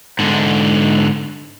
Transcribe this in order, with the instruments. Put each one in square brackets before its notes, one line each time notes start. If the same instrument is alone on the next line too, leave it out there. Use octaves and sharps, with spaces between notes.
[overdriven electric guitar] G#2 D3